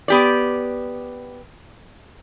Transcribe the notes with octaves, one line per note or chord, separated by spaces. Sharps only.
B3 G4 D5